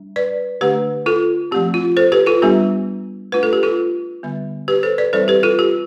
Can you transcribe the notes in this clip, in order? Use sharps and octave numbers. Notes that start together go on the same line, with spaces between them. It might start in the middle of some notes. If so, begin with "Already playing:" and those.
Already playing: G3 D4
B4 D5
D3 A3 D4 G4 B4
F4 A4
F3 A3 C4 G4
F4
A4 C5
G4 B4
F4 A4
G3 B3 D4 G4
A3 D4 F4 B4
A4
G4
F4 A4
D3 G3 B3
G4 B4
A4 C5
B4 D5
E3 G3 C4 E4 A4 C5
G4 B4
F4 A4
G4